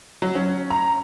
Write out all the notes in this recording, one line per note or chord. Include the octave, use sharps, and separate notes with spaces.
F#3
C#4
A#5